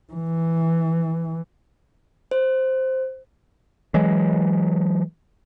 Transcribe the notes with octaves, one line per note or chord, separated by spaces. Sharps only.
E3
C5
E3 F#3 G#3